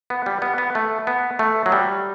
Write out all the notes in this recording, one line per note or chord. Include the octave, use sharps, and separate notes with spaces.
B3
G3
B3
B3
A3
B3
A3
F#3
G3